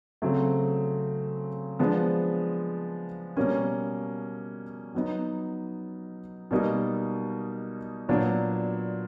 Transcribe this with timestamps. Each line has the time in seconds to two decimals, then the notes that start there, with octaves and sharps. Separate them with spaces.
0.22 C#3 F#3 A3 C4
1.79 F3 G#3 B3 D4
3.37 B2 G3 A#3 C#4
4.94 F#3 B3 D#4
6.51 B2 G3 A#3 D#4
8.09 A#2 F#3 B3 D4